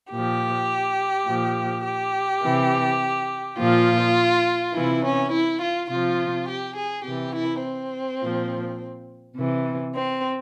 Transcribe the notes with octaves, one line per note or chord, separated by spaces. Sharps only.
A#2 F3 G4
A#2 F3
G4
C3 E3
A#2 F3 F4
C3 E3 E4
C#4
E4
F4
C3 F3 F4
G4
G#4
C3 G4
E3
E4
C4
A#2 F3
C3 E3
C4